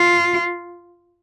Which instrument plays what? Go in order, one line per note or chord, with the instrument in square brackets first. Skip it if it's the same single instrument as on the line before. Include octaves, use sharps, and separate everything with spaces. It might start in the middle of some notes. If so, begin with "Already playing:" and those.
Already playing: [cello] F4